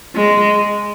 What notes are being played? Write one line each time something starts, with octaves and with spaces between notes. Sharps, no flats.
G#3